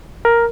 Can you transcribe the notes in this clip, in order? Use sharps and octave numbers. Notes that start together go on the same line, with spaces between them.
A#4